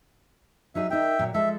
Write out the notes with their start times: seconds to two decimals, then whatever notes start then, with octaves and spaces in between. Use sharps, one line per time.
0.75 F#3 D#4 G#4 E5
0.90 D#4 A#4 E5 G5
1.19 A#2 F#3
1.34 F3 G#3 A4 E5